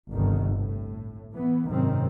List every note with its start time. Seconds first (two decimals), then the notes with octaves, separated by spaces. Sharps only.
0.11 G1 C2 D#3
0.55 A2
1.33 E3 B3
1.68 G#1 F#2 C3 D#3 C4